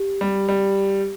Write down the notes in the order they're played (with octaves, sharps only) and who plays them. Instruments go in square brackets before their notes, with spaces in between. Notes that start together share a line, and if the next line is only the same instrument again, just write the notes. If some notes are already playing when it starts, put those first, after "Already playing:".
Already playing: [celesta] G4
[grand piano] G3
G3